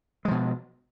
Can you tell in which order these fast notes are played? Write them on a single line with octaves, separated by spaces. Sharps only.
G#3 F3 B2